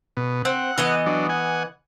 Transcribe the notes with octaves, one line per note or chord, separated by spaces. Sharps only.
B2
C4 F#5
E3 B3 D#5
F#3 D4
F#5 G#5